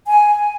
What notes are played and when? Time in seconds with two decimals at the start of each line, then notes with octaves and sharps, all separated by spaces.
0.07 G#5